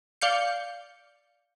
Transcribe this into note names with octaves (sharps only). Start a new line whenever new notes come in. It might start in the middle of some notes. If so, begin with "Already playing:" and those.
D5 F5 G6 C#7